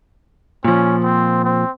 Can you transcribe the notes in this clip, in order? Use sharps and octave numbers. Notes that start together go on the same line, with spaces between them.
A#2 F3 C#4
C4
C4